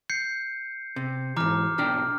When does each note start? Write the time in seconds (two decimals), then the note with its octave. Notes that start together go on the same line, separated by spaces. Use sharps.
0.10 G6 C7 C#7
0.96 C3
1.36 G#2 E3 A#5 D6 F6
1.78 B1 D4 G5 F6